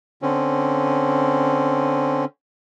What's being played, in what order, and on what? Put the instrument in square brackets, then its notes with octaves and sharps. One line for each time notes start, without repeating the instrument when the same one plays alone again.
[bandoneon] D3 C4 C#4